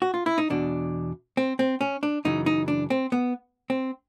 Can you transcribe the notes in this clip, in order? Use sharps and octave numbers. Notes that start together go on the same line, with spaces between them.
F#4
F4
E4
D#4
E2 B2 D4
C4
C4
C#4
D4
F#2 C#3 E3 D#4
D#4
D4
C4
B3
C4